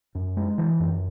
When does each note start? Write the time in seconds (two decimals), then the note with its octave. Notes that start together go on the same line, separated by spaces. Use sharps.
0.15 F#2
0.37 G#3
0.58 E3
0.80 F#2